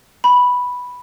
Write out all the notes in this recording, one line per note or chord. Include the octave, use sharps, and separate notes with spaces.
B5